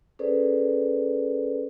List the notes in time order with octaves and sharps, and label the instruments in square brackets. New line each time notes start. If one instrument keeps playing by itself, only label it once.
[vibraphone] C#4 G#4 A4 B4 C5 D5